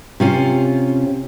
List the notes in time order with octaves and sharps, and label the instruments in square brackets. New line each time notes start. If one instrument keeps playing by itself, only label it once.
[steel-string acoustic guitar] C3 C#4 F4